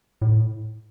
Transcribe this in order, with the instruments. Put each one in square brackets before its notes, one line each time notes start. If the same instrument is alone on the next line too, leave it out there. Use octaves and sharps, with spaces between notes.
[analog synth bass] A2